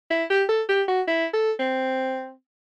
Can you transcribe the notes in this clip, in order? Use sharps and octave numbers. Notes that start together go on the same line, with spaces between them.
E4
G4
A4
G4
F#4
E4
A4
C4